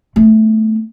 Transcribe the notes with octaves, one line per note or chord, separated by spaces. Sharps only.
A3 B3